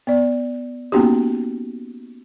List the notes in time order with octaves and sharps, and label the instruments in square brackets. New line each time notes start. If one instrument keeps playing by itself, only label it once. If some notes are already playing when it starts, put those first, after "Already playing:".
[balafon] B3 D5
A#3 B3 C#4 D#4 F#4 G4